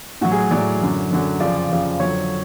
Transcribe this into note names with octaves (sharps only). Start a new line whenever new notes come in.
A2 F#3 F#4
G#4
A2 F#3 D5
F#2 D3 F#3
F#2 D3 F#3
F2 C#3 F3 D5
F2 C#3 F3
F2 D3 F#3 C#5